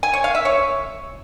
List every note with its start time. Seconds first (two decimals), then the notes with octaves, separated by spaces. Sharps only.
0.03 G#5
0.13 C#5
0.24 F5
0.35 E5
0.45 C#5